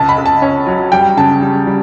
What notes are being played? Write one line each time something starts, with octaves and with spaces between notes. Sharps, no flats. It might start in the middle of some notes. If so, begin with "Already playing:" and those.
Already playing: C#2 A5
B5
C#2
A5
C#4
F#3
G3 G5
C#3 A5
G3
G3